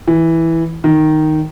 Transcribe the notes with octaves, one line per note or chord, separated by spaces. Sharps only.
E3
D#3